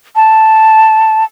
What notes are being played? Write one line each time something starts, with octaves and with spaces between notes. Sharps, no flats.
A5